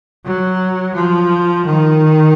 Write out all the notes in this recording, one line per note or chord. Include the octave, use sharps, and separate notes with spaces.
F#3
F3
D#3